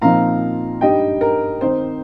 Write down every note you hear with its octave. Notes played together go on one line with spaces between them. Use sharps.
A#2 F3 C4 D#4 F5 A#5
G2 G3 D#4 D#5 G5
A#4
D#3 C4 D#4 C5